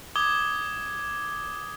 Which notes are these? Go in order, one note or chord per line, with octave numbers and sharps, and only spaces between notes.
D6 D#6 G#6 G7